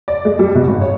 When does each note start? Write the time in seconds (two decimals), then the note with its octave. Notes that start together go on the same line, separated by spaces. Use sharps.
0.08 D5
0.25 G#3
0.39 G3
0.55 B2
0.68 G#1
0.81 C#5